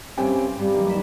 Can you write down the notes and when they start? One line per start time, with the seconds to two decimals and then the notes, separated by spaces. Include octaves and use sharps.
0.18 G2 C3 C#4 C5 G5 G#5 D6
0.59 G2 C3 G3
0.74 D#3 F#3 A#3
0.89 F#1 B6 E7